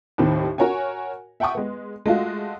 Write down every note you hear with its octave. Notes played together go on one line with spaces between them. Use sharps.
D#2 A2 C3 D#3 C4
F#4 A#4 C#5 F#5 G#5
E5 F#5 G5 A5 C#6 D#6
G#3 B3
G#3 A3 F4 F#4